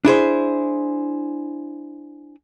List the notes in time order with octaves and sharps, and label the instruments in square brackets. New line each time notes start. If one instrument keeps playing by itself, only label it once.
[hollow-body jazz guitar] D4 E4 G#4 C5